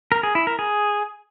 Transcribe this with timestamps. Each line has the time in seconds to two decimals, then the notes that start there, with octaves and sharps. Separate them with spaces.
0.12 A#4
0.23 G#4
0.35 E4
0.47 A#4
0.59 G#4